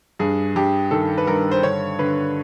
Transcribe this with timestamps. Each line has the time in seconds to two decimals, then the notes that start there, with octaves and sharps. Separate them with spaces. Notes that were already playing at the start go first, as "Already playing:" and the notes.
0.19 G2 G#4
0.56 G2 G4
0.91 D#3 A4
1.18 B4
1.27 G2 A#4
1.51 C5
1.63 D3 C#5
1.99 D3 B4